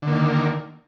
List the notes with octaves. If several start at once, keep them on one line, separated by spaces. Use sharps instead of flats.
D3 D#3 A#3